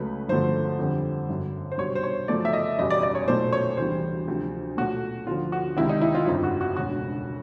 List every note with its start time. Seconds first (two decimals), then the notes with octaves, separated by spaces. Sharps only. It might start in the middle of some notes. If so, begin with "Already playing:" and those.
Already playing: C#2 C#3 F#3 A3 B4
0.28 G1 F#2 D3 F3 A3 C5
0.79 F2 D3 G3
1.29 G1 F#2 D3
1.72 C5
1.78 C2 B2 G3 C#5
1.95 C5
2.03 C#5
2.28 F#2 C#3 F3 A3 D5
2.45 E5
2.53 D#5
2.78 F#1 E2 B2 G3 D#5
2.90 D5
3.03 D5
3.15 C#5
3.28 B1 A#2 F#3 A3 C5
3.53 C#5
3.77 D2 C3 E3 G3 C5
4.28 D2 C3 F3
4.77 B1 A#2 F#3 A3 F#4
5.27 D2 D3 F3 F4
5.52 F#4
5.76 C#2 C3 D#3 E4
5.89 D#4
6.01 E4
6.15 F4
6.27 G1 F2 C#3 F3
6.44 F#4
6.61 F#4
6.76 E1 D2 C#3 F#4